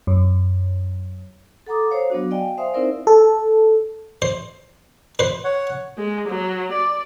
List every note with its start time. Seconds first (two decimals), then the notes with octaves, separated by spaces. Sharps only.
0.07 F#2
1.67 A4 F#5 A#5 D6 D#6
1.90 C5 C#5 F5
2.10 F#3 B3 D4 F#4
2.31 D5 D#5 F5 G5 G#5
2.58 C5 E5 F5 G#5 C6 D#6
2.74 C4 D#4 E4 A#4 C5 D5
3.07 A4
4.22 C5
5.19 B4 C5
5.44 C#5 F#5
5.98 G#3
6.29 F#3
6.73 D5